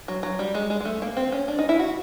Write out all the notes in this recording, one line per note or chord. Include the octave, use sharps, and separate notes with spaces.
F#3
F#3
G3
G#3
G#3
G#3
A3
A#3
C4
C#4
D4
D#4
E4
F#4